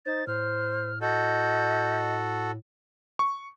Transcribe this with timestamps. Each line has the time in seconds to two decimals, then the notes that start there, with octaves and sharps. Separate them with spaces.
0.06 D#4 C5 A6
0.27 A2 C5 F6
1.01 F#4 A4 D#5 G6
3.19 C#6